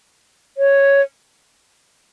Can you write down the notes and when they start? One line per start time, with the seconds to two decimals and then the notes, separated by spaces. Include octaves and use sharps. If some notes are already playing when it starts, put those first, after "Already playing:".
0.58 C#5